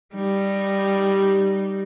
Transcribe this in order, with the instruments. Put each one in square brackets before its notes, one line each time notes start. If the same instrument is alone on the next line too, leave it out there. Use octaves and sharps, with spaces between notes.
[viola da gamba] G3 D#4